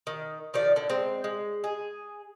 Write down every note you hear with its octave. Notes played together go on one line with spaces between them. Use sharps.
D#3
D#3 F3 D5
D3
G#3 C4
G#3
G#4